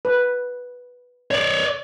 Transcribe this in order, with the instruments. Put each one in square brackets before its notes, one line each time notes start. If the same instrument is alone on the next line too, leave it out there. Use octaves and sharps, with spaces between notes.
[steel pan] B4
[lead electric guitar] C#5 D5